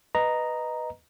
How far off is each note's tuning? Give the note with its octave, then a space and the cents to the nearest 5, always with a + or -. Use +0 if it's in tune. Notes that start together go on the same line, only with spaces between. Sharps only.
B4 +0 D#5 +0 A#5 +0